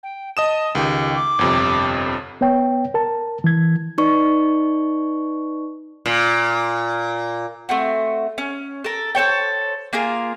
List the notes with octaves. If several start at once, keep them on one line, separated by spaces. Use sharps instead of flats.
G5
D#5 A5 D#6 E7
C#2 D#3 G4 G5
D6
G1 F2 C3
B3 C#5 G5
A#4 A5
E3 G#6
D#4 B4 D5 C#6
A#2
A3 C4 F#4
C#4
A4 A#4
A4 C5 C#5 G5
A#3 F4 G#4 A#4